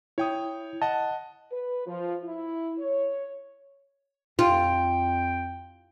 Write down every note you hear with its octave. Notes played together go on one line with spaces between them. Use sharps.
E4 C#5 G5 D#6
D#5 F#5 A5
B4
F3
E4
C#5
F2 F4 G5